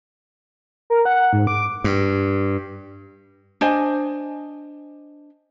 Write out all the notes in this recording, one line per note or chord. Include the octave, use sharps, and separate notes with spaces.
A#4
F#5
G#2
D6
G2
D4 C5 D#5 G#5